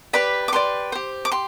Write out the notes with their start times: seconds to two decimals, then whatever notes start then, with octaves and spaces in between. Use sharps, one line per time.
0.13 G4 B4 D5 B5
0.48 D6
0.52 G4 B4 D5 C6
0.92 G4 C5
1.25 D6
1.31 G4 C6